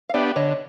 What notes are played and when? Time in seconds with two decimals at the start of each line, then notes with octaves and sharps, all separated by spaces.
0.09 F5
0.14 B3 D4 G4 D5 E5
0.36 D3 C#5 D#5